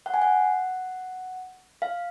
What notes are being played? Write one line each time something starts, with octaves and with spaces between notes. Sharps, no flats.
F#5
G#5
F#5
F5